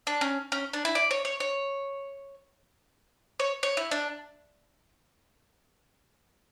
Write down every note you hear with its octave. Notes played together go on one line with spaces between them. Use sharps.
D4
C#4
C#4
D4
E4
D5
C#5
C#5
C#5
C#5
C#5
E4
D4